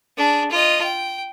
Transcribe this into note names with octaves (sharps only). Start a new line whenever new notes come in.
D4 G#4
F4 D#5
G5